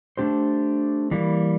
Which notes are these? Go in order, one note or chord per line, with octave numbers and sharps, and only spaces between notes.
A3 D4 G4 C5
E3 G3 A#3